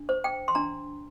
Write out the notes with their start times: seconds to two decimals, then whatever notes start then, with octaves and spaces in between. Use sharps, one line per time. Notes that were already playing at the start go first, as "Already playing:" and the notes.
Already playing: D4
0.09 C5
0.24 G5
0.48 C6
0.55 D4 A#5